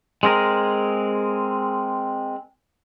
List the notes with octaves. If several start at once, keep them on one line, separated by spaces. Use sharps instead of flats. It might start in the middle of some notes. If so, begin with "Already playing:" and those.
G#3 C4 G#4 A#4